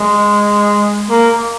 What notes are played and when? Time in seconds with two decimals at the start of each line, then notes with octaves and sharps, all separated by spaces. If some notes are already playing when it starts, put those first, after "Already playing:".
Already playing: G#3
1.10 A#3